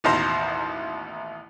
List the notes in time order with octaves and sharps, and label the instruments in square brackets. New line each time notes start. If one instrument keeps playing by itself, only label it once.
[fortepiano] A1 D#2 B2 C5 A#5